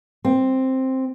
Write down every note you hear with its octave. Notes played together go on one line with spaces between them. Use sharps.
C4